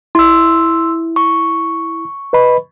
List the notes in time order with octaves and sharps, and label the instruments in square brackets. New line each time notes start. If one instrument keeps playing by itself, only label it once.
[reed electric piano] E4 [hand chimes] C6 E6
[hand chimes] C#6
[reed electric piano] B4 D#5 B5